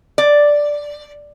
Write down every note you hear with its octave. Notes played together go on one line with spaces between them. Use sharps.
D5